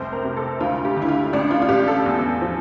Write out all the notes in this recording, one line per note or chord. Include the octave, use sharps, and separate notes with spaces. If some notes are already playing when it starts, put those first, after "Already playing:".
Already playing: F1 C2 C5
A#4
C3
A4
D2 F4
G4
D3
E4
F4
A1 D4
F4
F4
A1 G4
A4
E2
F3